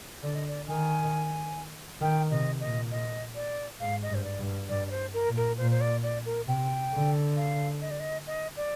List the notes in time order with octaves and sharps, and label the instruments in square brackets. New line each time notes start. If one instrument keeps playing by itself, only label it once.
[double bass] D3 [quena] D5
[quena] D#5
D5
[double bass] D#3 [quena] G#5
[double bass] D#3 [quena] G5
[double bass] C3 [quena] D#5
[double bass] A#2 [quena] D#5
[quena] D#5
D5
[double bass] G#2 [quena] F5
[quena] D#5
[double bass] G2
[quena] C5
D5
[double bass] G2
[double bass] G2 [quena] D5
[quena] D5
C5
A#4
[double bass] A#2
[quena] A#4
[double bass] A#2 [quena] C5
[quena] C5
D5
D5
A#4
[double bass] C3 [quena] G5
[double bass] D3
[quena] F5
D#5
D5
D#5
D#5
D5